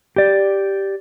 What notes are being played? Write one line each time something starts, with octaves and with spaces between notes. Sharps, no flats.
G4 D5